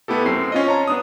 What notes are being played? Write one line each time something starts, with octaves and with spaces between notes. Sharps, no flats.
A3 B3 E4 G4 A4
F#2 C4 C7
C#4 F4 D#5
C#5 A5 A#5
B3 D4 D#6